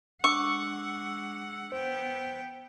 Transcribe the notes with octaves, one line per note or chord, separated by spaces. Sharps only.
G#3 D4 F#5 C#6 D6 E6
B3 C5 G5